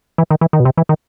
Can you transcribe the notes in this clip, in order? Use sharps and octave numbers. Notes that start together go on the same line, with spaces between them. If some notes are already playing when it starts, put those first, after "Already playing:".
E3
D#3
E3
D#3
B2
C3
E3
D#3